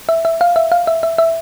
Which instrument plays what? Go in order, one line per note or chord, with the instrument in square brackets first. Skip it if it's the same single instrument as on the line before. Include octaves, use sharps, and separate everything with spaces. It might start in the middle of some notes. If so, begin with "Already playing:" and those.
[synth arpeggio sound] E5
E5
F5
E5
F5
E5
E5
E5